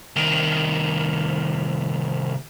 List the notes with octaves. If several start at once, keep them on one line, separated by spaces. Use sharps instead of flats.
C2 D#3